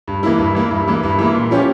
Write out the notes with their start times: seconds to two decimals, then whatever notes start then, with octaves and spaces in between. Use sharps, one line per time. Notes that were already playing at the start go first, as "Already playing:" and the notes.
0.08 G2
0.23 E3 A#3 E4
0.39 G2
0.55 E3 A#3 E4
0.71 G2
0.88 E3 A#3 E4
1.03 G2
1.18 E3 A#3 E4
1.35 A#2
1.51 F3 C#4 G4